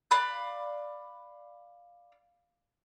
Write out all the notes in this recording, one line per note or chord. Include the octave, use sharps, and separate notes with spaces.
D5 F5 B5 F#6